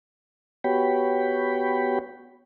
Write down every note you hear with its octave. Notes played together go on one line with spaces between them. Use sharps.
B3 F#4 G4 C#5 G5 B5